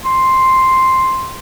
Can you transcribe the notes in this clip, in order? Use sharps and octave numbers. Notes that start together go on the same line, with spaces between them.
C6